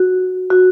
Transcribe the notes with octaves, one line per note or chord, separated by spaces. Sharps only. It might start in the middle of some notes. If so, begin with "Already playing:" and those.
Already playing: F#4
F#4